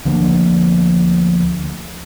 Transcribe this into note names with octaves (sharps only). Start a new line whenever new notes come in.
D2 D3 F3 A#3